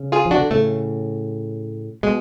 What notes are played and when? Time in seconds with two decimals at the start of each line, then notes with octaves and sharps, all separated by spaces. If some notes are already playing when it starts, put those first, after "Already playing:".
Already playing: C#3
0.12 F4 G#4
0.26 F3
0.31 D4 F#4
0.38 D3
0.50 A2 C#3 A3
2.03 B2 G#3